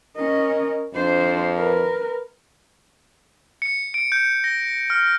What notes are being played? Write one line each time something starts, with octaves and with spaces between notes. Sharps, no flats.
C#4 A#4 D#5
F2 D4 C5
A#4 B4
C#7
D7
G6
A#6
F6